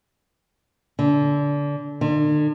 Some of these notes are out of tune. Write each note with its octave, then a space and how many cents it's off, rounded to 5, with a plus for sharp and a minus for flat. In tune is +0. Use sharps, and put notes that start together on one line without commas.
D3 -25
D3 +40